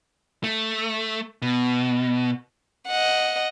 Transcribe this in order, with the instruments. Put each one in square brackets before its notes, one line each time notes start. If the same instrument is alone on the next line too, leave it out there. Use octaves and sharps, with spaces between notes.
[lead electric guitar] A3
B2
[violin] D#5 F#5